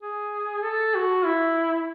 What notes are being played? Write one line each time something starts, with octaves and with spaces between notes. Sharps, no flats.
G#4
A4
F#4
E4